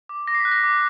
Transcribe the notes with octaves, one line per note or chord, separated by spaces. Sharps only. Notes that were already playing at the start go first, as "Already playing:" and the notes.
D6
D6 A#6
C7
B6
F#6
A#6
D6